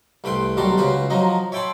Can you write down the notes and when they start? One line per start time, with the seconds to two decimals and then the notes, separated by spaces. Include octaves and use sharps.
0.24 C2 A3 B4 G5 C6
0.57 B1 D#3 G3 F#4 A5 C6
0.77 C#2 C#3 F#4 B4 C5
1.10 F3 F#3 D#4 D#5
1.52 C#5 E5 G5 A5 B5 C6